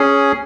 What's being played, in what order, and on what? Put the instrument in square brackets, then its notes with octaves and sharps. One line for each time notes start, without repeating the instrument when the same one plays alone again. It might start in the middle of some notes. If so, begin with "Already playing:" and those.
Already playing: [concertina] C#4 G#4